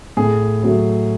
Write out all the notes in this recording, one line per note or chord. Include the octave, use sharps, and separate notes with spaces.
A2 G#4
F#3 A3